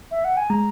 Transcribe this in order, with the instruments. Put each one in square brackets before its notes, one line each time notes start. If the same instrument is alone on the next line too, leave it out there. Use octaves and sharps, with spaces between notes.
[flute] E5
F#5
G#5
[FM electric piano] G#3 [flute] A#5